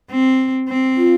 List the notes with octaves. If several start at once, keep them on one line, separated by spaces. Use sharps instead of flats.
C4
C4
F4